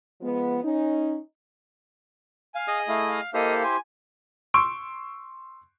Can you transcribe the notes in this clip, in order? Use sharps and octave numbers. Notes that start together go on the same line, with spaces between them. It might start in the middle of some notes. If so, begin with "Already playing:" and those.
F3 G#3 B3
C#4 D#4
F5 G#5
G#4 D#5 D#6
A3 E4 F5
F5
A#3 E4 G4 A4 C5 D#5 F5
G#5 C6
C6 C#6 E6 D7